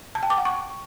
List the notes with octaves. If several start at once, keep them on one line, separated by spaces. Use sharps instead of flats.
A5
G5
D6
F#5
C#6